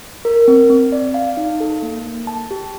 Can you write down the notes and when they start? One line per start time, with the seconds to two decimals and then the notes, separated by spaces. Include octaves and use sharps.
0.25 A#4
0.48 C4
0.70 C4
0.92 D5
1.14 F5
1.37 D#4
1.60 A4
1.82 A#3
2.05 A#3
2.27 A5
2.51 G4